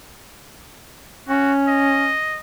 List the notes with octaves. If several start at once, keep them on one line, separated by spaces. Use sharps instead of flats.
C#4 F#4
D#5